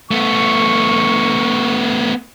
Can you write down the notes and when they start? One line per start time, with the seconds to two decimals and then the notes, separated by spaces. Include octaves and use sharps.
0.11 A3 B3 C#6